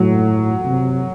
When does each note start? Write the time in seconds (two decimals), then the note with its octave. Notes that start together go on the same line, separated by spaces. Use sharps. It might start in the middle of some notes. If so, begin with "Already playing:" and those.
Already playing: A2 F#3
0.65 C3